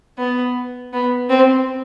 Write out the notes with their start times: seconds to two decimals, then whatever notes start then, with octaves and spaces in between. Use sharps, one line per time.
0.18 B3
0.93 B3
1.29 C4